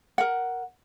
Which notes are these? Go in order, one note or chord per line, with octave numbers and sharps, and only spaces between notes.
A#4 F#5